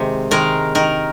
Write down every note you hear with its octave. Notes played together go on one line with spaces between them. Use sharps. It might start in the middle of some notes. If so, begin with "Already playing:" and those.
Already playing: C3 D#3 G#3
D#3 G#3 A#4
D#3 A#4